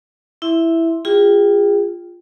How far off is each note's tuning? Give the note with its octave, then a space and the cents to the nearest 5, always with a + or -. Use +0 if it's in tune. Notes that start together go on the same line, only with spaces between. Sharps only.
E4 +0 E5 +0 C6 +0
F4 +0 G#4 -30 G5 +0